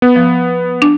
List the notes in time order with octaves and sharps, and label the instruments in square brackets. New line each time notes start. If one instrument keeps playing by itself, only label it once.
[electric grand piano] B3
[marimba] F3
D4